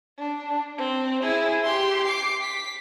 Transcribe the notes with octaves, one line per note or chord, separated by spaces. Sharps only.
D4
C4
E4 G#4
G4 C6
D6 C7
B6